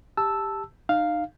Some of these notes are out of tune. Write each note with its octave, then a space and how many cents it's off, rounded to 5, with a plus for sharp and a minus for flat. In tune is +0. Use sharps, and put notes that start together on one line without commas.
G4 +15 A5 +0 E6 +0
D#4 -30 F5 +0